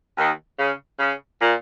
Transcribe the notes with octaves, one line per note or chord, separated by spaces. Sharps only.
D#2 D#3
C#3
C#3
A#2